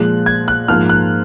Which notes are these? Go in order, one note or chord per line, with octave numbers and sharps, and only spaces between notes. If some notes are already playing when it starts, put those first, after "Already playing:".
Already playing: A#2 F3 G#3 F#6
G#6
F#6
G#2 F3 A#3 F6
F#6